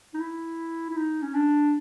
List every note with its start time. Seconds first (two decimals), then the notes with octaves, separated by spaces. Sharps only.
0.14 D#4
0.20 E4
0.90 E4
0.97 D#4
1.22 C#4
1.34 D4